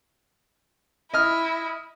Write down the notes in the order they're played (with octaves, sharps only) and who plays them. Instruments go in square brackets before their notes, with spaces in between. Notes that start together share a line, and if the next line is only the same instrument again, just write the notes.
[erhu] E4 [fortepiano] D#5 F6